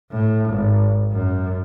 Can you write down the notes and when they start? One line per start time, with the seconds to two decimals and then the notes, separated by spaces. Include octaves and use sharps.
0.11 A2
0.50 G#1
1.12 F#2